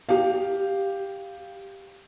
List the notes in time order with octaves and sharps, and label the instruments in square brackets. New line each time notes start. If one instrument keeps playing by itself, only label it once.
[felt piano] G4 F5